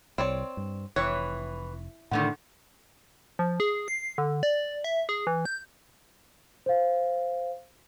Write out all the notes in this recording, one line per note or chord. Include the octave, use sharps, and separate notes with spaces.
C2 C4 C#5 D5
G2
F1 E3 C#5 G5 C#6 F#6
E2 A2 D3 D#3 A3 F#5
F3
G#4
C7
D3
D5
E5
G#4
E3
G6
C5 F5